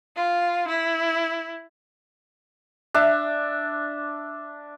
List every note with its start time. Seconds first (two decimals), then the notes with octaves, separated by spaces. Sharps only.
0.16 F4
0.68 E4
2.94 D4 E5